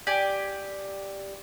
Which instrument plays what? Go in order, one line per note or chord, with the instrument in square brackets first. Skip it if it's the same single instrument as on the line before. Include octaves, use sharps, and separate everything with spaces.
[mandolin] G4 D5 G#5